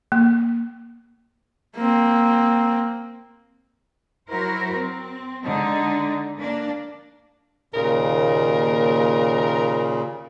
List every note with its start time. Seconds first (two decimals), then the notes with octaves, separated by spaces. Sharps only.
0.12 A#3
1.76 A#3 C4
4.29 F#3 E4 F#4 A#4 C5
4.76 C4
5.45 D3 G#3 D4 D#4
6.38 A#3 D4
7.74 D#2 A#2 C#3 A#4